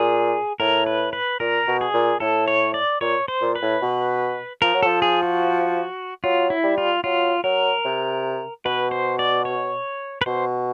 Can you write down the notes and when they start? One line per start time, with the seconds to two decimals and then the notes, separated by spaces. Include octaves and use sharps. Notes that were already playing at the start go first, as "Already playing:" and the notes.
Already playing: A#2 G#4
0.60 A2 A#4
0.86 B4
1.13 B4
1.40 A#2 A#4
1.68 B2
1.81 G#4
1.94 A#2
2.20 A2 A4
2.48 C#5
2.74 D5
3.01 A#2 C#5
3.28 C5
3.41 A#2
3.55 B4
3.62 A2
3.82 B2
4.62 F3 A#4
4.74 F#3
4.83 F3 A4
5.02 G#4
5.23 F#4
6.24 F#3 F4
6.50 E4
6.63 G3
6.78 F4
7.04 F#3 F4
7.44 F#3 A#4
7.85 C3
8.65 B2 B4
8.91 C5
9.19 D5
9.45 C#5
10.22 B4
10.26 B2 C5